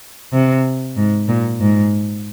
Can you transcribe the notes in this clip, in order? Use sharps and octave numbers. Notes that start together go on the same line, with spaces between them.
C3
G#2
A#2
G#2